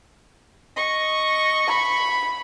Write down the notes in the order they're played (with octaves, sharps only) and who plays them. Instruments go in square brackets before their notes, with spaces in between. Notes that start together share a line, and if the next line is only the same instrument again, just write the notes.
[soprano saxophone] D#5 [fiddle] C#6
[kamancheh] B5